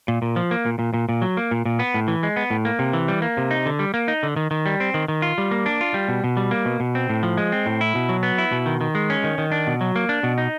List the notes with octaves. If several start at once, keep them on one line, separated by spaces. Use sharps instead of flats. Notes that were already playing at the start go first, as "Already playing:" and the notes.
A#2
A#2
F3
A#3
A#2
A#2
A#2
A#2
F#3
A#3
A#2
A#2
B3
A2
E3
G#3
B3
A2
A#3
C3
E3
G3
A#3
C3
D#4
D3
G3
A#3
D#4
D3
D#3
D#3
G3
C4
D#3
D#3
F4
G3
A#3
D4
F4
G3
B2
B2
G3
A#3
B2
B2
C4
A2
F3
G#3
C4
A2
E4
B2
F#3
B3
E4
B2
D#3
D#3
G#3
C#4
D#3
D#3
D4
B2
F#3
A#3
D4
B2
D#4